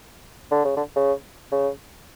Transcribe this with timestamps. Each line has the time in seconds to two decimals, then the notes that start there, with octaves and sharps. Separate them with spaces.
0.51 D3
0.65 C#3
0.77 D3
0.96 C#3
1.52 C#3